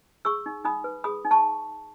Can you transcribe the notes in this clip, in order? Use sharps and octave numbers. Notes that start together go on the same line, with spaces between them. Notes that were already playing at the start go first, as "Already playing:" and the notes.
G#4 C#6 E6
D#4
D#4 B5 D#6
B4
G#4 B5 D#6
D#4
A5 C#6